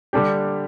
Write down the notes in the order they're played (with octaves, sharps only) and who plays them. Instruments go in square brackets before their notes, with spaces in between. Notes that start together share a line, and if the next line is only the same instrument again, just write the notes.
[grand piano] D3 G3 D4 G4